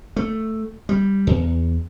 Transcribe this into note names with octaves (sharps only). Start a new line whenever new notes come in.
A3
G3
E2